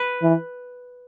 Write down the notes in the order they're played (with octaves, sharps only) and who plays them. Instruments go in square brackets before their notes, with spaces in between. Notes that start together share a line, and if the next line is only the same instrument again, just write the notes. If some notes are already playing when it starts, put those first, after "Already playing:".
Already playing: [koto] B4
[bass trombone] E3